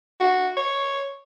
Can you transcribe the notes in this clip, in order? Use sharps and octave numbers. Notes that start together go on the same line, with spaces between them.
F#4
C#5